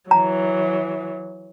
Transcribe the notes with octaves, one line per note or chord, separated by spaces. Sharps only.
E3 F#3 A#5